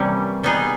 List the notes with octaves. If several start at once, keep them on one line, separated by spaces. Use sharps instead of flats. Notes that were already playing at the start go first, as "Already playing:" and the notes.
Already playing: C3 E3 G3 A#3 C#4
G3 B3 D#4 G#4